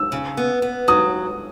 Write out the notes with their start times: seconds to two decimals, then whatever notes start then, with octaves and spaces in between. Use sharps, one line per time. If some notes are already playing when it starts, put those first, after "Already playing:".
Already playing: E6
0.12 C#3
0.37 B3
0.62 B3
0.88 F#3 D#6